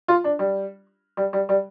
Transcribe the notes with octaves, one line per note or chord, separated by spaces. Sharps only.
F4
D4
G3
G3
G3
G3